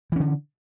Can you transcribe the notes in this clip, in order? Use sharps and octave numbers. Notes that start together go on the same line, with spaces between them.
D3 E3 C#4